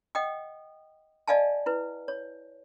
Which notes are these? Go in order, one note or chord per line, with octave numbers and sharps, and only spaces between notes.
D#5 F#5 G5 D#6
D5 D#5 F5 G#5 A5
E4 B4
C#5